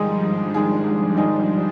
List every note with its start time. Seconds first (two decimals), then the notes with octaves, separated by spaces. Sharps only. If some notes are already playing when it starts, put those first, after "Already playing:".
Already playing: G#2 D#3 F3 G3 G#3 D#4 G#4
0.23 G#2 D4
0.54 D#3 G#3 D#4 G#4
0.86 G#2
1.17 D#3 G#3 D#4 G#4